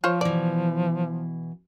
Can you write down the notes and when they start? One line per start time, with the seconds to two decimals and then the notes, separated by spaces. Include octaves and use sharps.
0.04 F3 F4 C5 C#5
0.21 B2 E3 D5